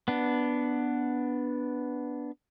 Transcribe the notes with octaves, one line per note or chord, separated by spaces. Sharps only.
B3 D4